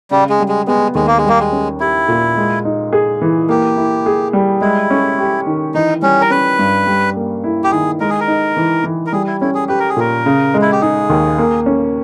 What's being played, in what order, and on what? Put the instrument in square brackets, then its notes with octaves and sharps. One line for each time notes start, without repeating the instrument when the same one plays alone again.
[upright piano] C#3 [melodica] G3
[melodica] G#3
[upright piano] G3
[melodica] G#3
[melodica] G#3 [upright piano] B3
[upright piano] D#2 [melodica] G#3
[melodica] A#3
G#3
[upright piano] G3 [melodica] A#3
[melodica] G#3
[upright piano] C#4
[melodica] E4 [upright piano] G4
[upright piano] A#2
G#3
D#4
G#4
E3
[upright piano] A#3 [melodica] G4
[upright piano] E4
G#4
G3
[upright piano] G#3 [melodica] E4
[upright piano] C#4
G4
D#3
[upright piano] E3 [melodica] D#4
[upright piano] G3 [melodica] C#4
[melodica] A#4
[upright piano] C#4 [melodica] B4
[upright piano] G2
G3
A#3
E4
[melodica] G4
[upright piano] D#3 [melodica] G#4
[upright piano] G#3 [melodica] A#4
[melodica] G#4
A#4
[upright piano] D#4
E3
E3
[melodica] A#4
[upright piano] G3 [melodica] G#4
[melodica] E4
[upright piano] C#4 [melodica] E4
[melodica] G#4
[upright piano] G4 [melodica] B4
[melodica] A#4
G#4
[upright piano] A#2 [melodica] A#4
[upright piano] C#3
G#3
[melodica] E4
G4
[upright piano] D#4 [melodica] G#4
[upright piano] D#2
A#3
C#4